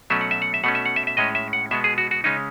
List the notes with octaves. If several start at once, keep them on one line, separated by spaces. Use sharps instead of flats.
B2 F#3 A3 C#4 E5
F#5
E5
F#5
E5
B2 A3 C#4 F#5
E5
F#5
E5
E5
A2 G#3 C#4 D#5
E5
F#5
B2 G#3 B3 E5
G#4
F#4
F#4
C#3 G#3 C#4 D#4